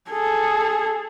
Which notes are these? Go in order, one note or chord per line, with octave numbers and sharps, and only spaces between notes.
G#4 A4